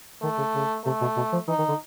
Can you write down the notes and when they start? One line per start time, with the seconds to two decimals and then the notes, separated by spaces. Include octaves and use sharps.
0.22 D#3 A3
0.38 C#3
0.54 C#3
0.85 C3 A3
1.01 B2
1.16 B2
1.33 F3
1.48 E3 D#4
1.58 D#3
1.68 D3